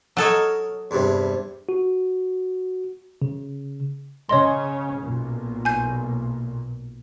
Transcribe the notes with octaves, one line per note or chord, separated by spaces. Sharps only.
F#3 A4 A#4 C#5 D#5
E2 G2 C3
F#4
C#3
C#3 C#4 C#5 D#5 C6
B1 A#2
G#5 G6